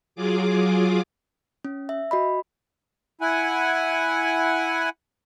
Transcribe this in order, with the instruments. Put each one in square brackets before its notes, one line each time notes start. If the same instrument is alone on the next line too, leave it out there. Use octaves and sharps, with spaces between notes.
[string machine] F#3 F4 G#4 D6
[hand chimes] C#4
E5
F#4 D#5 B5
[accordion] E4 F#5 G#5